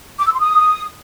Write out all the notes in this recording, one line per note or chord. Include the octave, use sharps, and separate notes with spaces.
D6
E6
C6
D#6